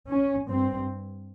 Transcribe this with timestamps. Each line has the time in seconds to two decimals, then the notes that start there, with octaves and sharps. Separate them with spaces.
0.09 C#4
0.49 G2 C4